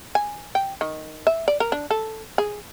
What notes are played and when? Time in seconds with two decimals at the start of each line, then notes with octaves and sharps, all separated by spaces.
0.15 G#5
0.55 G5
0.81 D#3
1.27 E5
1.48 D5
1.60 A#4
1.72 D4
1.91 A4
2.38 G#4